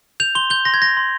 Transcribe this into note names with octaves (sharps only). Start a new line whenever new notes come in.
G6 F7
C6 G7
G6 G7
C6 A#6
G#6
G6 A#6
C6